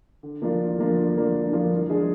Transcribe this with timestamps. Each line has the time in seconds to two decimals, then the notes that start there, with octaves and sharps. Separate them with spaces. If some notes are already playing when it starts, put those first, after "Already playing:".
0.23 D3
0.42 F3 A#3 D4 F4
0.60 D3
0.79 F3 A#3 D4 F4
0.97 D3
1.16 F3 A#3 D4 F4
1.35 D3
1.53 F3 A#3 D4 F4
1.71 G2
1.89 F3 G#3 D4 G#4